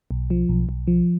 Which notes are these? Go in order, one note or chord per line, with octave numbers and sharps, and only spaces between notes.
B1
F3
B1
B1
F3